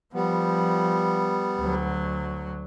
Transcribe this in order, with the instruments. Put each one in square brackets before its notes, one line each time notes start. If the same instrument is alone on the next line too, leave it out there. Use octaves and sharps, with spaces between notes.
[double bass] F3 [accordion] G3 B3
[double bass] D2 F#3